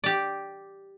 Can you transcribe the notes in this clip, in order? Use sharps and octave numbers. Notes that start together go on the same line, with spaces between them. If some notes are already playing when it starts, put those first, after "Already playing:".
G4 D5